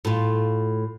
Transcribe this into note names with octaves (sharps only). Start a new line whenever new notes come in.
A2 F4